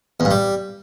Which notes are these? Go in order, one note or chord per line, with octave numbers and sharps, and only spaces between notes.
E2
G2
G3